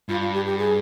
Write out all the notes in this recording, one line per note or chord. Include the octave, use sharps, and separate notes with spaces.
G2 F4
F4
G4
G4
G#4